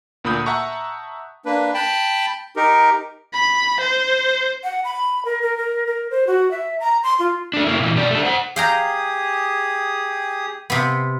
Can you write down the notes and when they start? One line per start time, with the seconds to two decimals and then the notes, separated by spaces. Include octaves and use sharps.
0.24 D2 A#2 A#3 B5 D#6 G6
0.46 E5 F#5 A5 A#5 C#6
1.46 A#3 D4 B4
1.74 G5 A5 B5
2.56 D#4 G4 A#4
3.34 B5
3.80 C5
4.64 F#5
4.84 B5
5.25 A#4
5.42 A#4
5.57 A#4
5.87 A#4
6.11 C5
6.27 F#4
6.51 E5
6.80 A#5
7.03 C6
7.19 F4
7.54 A3 D4
7.66 A#3 E4
7.80 A#2 E3
7.96 B2 G4 D5
8.11 A3 D4
8.25 C5 F#5
8.56 G4 G#4 F5 G5 A#5 D#6
10.70 C3 B3